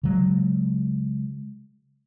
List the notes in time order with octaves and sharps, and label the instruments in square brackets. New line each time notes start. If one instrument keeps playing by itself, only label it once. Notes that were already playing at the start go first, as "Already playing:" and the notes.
[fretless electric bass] C#3 F#3 G#3